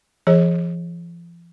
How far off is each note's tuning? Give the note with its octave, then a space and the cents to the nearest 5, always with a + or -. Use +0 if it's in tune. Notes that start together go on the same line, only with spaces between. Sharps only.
F3 -40 G#4 +0 C#5 -35